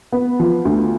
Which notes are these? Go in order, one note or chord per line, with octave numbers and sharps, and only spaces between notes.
B3
F3
D2